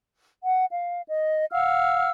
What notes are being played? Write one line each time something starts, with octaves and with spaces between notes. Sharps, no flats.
F#5
F5
D#5
F5 F#5 E6 F6